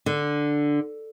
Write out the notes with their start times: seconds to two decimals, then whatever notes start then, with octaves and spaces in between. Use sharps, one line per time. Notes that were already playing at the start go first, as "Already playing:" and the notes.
0.06 D3